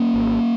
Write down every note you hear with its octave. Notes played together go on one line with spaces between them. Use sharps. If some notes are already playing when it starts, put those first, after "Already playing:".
Already playing: A#3 C#4
G#1